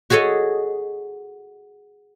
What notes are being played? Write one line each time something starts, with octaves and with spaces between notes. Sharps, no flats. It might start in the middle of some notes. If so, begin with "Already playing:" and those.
F#4 G#4 A4 C#5 D#5